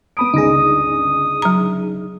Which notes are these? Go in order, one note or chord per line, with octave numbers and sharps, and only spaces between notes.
B3 B5 D#6 D7
G1 C#2 D#4 G#4 A#6
F#3 A#5